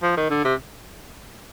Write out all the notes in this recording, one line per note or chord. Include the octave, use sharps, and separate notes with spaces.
F3
D#3
D3
C3